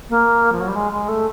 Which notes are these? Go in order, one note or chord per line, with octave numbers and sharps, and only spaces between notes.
A#3
F3
F#3
G3
G#3
G#3
A3